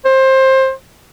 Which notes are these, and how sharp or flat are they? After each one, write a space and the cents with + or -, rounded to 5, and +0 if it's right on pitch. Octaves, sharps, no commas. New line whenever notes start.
C5 +20